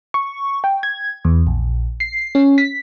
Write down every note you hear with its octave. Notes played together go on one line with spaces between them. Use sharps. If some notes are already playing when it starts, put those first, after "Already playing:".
C#6
G5
G#6
E2
A#1
C7
C#4
B6